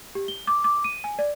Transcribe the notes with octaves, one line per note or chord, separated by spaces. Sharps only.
G4
G7
D6
D6
D#7
G#5
D5